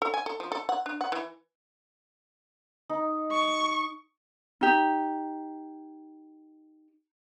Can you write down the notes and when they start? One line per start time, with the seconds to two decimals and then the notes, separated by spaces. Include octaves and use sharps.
0.02 A4
0.14 G#5
0.26 A4
0.40 F3
0.52 A4
0.69 F#5
0.86 D4
1.01 F#5
1.12 E3
2.90 D#4
3.31 C#6
4.61 D#4 G4